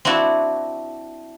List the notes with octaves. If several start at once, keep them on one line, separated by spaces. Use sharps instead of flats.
C4 D4 E4 F#4